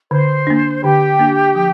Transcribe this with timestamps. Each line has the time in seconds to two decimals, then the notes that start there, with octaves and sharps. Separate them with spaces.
0.11 D3 C5
0.47 A#3 D4
0.83 D3 G4
1.20 A#3 D4
1.55 F3